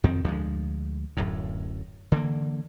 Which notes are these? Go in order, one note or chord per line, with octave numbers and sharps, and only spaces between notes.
F2 D#3 C4
D2 F3 G#3
D1 F#2 A2
D3 E3 A3 A#3